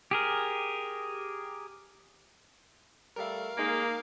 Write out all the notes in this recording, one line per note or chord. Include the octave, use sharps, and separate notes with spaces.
G4 G#4 A#4
G3 A3 A4 A#4 F5
G#3 A#3 D#4